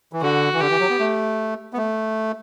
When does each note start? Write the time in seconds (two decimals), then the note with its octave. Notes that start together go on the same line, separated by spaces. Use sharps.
0.13 E3
0.22 D3 F#4
0.53 E3
0.61 D3 G4
0.70 E3
0.80 F#3
0.90 B3
1.00 A3
1.73 B3
1.77 A3